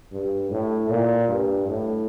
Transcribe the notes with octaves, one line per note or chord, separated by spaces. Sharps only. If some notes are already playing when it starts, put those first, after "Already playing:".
G2
A2
A#2
G2
A2